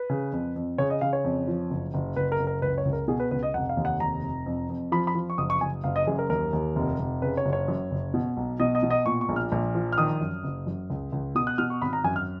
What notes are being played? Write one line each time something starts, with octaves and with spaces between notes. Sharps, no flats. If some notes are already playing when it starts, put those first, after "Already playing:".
Already playing: B4
C#3
F2
F2
C#3 C#5
D#5
C#3 F5
C#5
F2
F3
F#1
F#1
F#1 B4
A#4
F#1
A#4
C#2 B4
C#5
C#2
A#4
B2 G#4
B4
C#2 B4
D#5
F1 F#5
F5
D#2
F#5
F1 A#5
F1
F2
F2
F3 B5
B5
F3
C#6
F#1 D#6
C#6
F#1 G#5
F#1 F5
D#5
F#2 G#4
A#4
D#2 A#4
D#2
F1
F1
C#3 B4
C#5
F#1
C#5
F#2
F#1
B2
B1
B2 D#5
D#5
B2
D#5
A#2 C#6
C#6
A#1
F6
A#1
F3
F6
D#3 D#6
F#2
F#1
F#2
C#2
C#2
B2 D#6
F#6
B2 F6
C#6
G#1 B5
A#5
F#2 G#5
F6